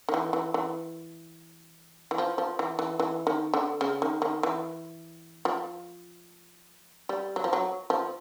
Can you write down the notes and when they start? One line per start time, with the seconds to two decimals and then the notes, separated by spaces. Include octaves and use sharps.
0.09 D#3
0.14 E3
0.33 E3
0.54 E3
2.11 E3
2.18 F3
2.38 F3
2.59 E3
2.79 E3
3.00 E3
3.27 D#3
3.54 D3
3.81 C#3
4.02 D#3
4.22 D#3
4.43 E3
5.45 F3
7.09 G3
7.36 F#3
7.44 F3
7.53 F#3
7.90 F3